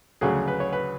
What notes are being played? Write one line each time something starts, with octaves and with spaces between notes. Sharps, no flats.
D2 C#3 F#3 G#4
B4
C#5
B4